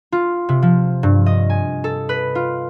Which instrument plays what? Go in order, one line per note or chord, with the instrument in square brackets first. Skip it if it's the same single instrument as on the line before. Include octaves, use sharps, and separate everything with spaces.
[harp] F4
C3
F3
G2
D#5
G#5
A4
B4
F4